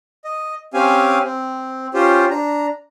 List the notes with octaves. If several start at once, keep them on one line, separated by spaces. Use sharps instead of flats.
D#5
C4 C#4 G4 F5 G#5
C4
C#4 F4 G4 C5
D4 A#5